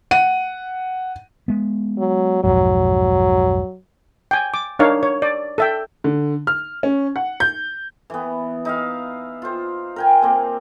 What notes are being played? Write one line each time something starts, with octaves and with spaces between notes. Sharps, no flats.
F#5 D#7
G#3 B3
F#3
B1 F2 G#2 F#3
G5 G#5
D6
D4 D#4 A#4 C#5 F5
C#5
D5
A4 E5 G5
D3
F6
C#4
F#5
G6
E3 B3
D#4 E5 F5
F4 C5
A#4 G5 G#5
A#3 C4